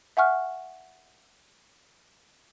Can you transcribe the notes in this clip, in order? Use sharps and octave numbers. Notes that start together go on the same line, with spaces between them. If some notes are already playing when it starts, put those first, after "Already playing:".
E5 F#5 G#5 C#6 F6 F#6